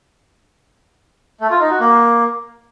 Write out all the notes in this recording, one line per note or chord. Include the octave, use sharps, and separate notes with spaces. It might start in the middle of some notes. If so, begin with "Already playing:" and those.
A3
F4
D#4
F#4
A#3